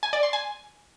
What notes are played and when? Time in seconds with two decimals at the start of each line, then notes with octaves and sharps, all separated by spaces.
0.03 G#5
0.13 D5
0.23 C6
0.33 G#5